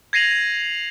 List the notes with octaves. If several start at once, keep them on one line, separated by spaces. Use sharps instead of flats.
G#6 A#6 C7 D#7 F7 F#7